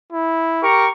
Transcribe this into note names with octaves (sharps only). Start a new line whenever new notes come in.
E4
G4 A#4 C#6